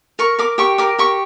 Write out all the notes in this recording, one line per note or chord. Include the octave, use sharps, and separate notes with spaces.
A#4 C#6
A#4 D6
G4 C#6
A#4 D6
G4 C#6